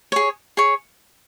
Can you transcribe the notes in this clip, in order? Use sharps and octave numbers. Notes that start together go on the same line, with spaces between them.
G#4 C#5
G#4 C#5